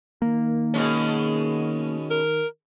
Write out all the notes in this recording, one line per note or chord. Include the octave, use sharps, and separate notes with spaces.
D#3 A#3
B2 G#3 C#4
A#4